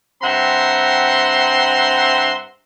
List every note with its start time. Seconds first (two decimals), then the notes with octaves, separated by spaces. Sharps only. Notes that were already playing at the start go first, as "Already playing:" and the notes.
0.22 G2 C4 E5 F#5 A#5 C6